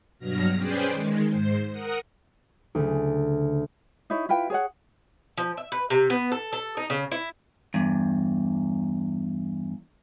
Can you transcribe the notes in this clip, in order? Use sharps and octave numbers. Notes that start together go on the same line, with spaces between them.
G2 B2 F#3 F6 A#6
C#4 G#4 B4 C5 D5 G5
D#3 G#3
G#2 C5
A#4 F#5 D#6
D2 C#3
D#4 E4 C#5
E4 F4 B4 G5
G#4 C#5 F#5
F3
E5
B4
C3
B3
A4
A4
D#4
C#3
E4
E2 G2